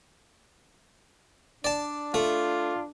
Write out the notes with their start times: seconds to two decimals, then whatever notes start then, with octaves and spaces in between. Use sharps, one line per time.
1.64 D4 D5 A5
2.14 A3 F4